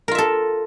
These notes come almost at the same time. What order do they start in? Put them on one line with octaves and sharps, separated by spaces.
A#4 F4 E5 A4